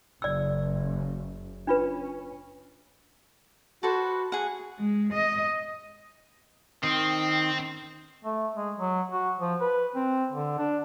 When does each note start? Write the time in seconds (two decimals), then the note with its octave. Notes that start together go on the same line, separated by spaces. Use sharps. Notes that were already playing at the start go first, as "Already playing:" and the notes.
0.22 F#1 D5 E6
1.67 C#4 D4 F4 B4
3.83 F#4 A4 B4 C5
4.32 G#4 F#5
4.79 G#3
5.13 D#5
6.84 D#3 C4
8.25 A3
8.57 G#3
8.77 F#3
9.12 F#4
9.40 F3
9.61 B4
9.96 C4
10.32 D3
10.58 D4